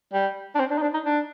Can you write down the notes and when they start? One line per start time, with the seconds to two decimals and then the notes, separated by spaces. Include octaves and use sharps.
0.14 G3
0.55 D4
0.59 C4
0.71 D4
0.78 D#4
0.82 D4
0.94 D#4
1.05 D4